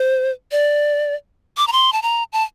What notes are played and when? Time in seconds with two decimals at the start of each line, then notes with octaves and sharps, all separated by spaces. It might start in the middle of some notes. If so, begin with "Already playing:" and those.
Already playing: C5
0.52 D5
1.57 D6
1.67 A#5
1.72 C6
1.93 A5
2.02 A#5
2.33 A5